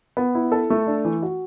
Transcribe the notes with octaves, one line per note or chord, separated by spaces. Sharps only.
B3
E4
A4
A3
D4
E3
F#4